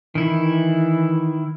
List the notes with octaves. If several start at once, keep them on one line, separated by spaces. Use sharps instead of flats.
D#3 E3 E4